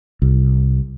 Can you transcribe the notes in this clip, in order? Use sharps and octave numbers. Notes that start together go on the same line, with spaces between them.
C2